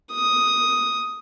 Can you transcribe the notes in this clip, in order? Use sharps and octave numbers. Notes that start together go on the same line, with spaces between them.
D#6